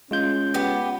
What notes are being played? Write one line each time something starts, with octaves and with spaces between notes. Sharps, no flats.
G#3 C#4 F4 G6
B3 G4